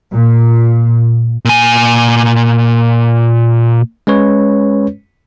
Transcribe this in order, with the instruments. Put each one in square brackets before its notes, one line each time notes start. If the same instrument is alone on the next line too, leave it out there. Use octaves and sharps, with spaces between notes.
[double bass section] A#2
[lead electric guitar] A#2 G#5
[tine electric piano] G#3 C#4 B4 C#5